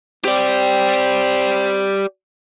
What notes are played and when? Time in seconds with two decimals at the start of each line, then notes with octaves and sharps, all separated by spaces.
0.25 C4 G4 D5